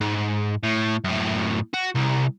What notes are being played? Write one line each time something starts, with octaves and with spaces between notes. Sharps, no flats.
G#2
A2
F#2 A2
F#4
C2